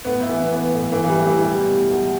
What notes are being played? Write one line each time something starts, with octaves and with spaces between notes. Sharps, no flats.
A2 B3
E4
E3
B3
E3
B3
A2
E3
A2
E3
G3
A2
E3
B2 G3
B2
E2